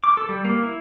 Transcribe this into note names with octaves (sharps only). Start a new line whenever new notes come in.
D6
A4
G3
A#3
E4